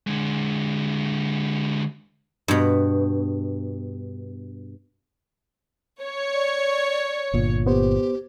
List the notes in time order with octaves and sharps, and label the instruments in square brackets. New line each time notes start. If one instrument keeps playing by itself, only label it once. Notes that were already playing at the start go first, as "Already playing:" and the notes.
[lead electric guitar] D3 G#3
[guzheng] G2 B2
[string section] C#5
[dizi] D5
[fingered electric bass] G1 A#2
[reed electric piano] B3 C5 [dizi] G4